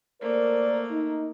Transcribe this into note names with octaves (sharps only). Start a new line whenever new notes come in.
A3 A#3 A#4 C5 D5
D#4